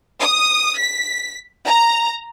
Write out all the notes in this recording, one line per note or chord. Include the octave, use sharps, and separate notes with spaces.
D#6
B6
A#5